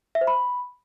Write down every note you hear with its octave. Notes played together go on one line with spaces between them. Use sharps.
E5
C5
B5